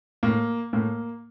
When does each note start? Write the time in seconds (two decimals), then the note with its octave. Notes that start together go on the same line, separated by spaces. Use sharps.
0.23 A2 A#3
0.73 A2 A#3